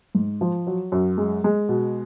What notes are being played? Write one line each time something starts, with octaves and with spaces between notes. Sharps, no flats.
G#2
F3
F#3
F#2
G#3
G#3
B2